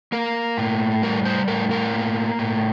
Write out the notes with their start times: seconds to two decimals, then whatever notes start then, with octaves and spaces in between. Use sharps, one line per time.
0.12 A#3 A#4
0.58 A2
1.03 G3 A#4
1.25 C5
1.48 A2 A#4
1.71 A#4
1.94 A#3
2.39 A2